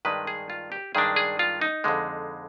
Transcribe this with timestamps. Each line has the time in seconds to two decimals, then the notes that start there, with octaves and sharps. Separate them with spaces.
0.05 G2 D#3 G#3 D4 B4
0.27 G#4
0.50 F4
0.72 G4
0.95 G2 D#3 G#3 D4 G#4
1.16 G#4
1.39 F4
1.62 D#4
1.84 F2 D3 G#3